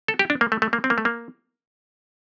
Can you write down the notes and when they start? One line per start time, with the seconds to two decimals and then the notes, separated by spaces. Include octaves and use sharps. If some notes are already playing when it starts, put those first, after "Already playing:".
0.08 A4
0.19 G4
0.30 D4
0.41 A#3
0.52 A3
0.62 A3
0.73 A#3
0.84 C4
0.90 A#3
0.98 A3
1.05 A#3